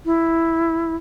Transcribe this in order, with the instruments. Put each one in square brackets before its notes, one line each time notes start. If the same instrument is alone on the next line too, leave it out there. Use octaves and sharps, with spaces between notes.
[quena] E4